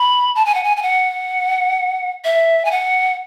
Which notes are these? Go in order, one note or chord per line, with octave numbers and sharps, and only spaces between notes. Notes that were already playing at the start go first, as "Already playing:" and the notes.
Already playing: B5
A5
G#5
F#5
G#5
G#5
F#5
E5
G#5
F#5